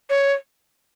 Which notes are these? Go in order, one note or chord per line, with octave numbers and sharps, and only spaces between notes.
C#5